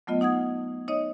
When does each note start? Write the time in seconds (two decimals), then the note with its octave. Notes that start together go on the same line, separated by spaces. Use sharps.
0.07 F#3 A3 B3 F4 D#5
0.21 D#4 F#5 D#6 G#6
0.88 D#4 C#5 D#5